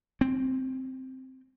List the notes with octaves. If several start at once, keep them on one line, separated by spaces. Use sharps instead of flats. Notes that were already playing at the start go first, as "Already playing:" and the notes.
C4